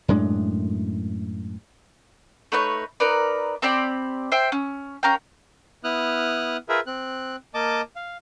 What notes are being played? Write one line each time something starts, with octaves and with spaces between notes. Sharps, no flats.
F#2 A2 G#3 D4
A3 D#4 B4 C#5
D#4 A#4 B4 D5
C4 G4 D5 B5
C5 E5 G5
C#4
C#4 A#4 F5 G5
B3 E4 D#6 F6 F#6
F4 G#4 A#4 B4 E5
C4 F#6
A#3 D#5 A5 D6
F5